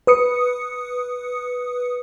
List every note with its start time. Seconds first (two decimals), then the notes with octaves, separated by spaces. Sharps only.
0.07 B4 D#6 C#7